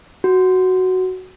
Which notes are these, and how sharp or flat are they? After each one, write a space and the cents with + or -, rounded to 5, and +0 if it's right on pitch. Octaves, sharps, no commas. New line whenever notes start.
F#4 +5